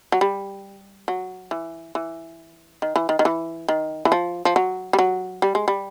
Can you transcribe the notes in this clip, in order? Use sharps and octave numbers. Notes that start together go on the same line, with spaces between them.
F#3
G3
F#3
E3
E3
D#3
E3
D#3
D#3
E3
D#3
E3
F3
F3
F#3
G3
F#3
G3
G#3
G3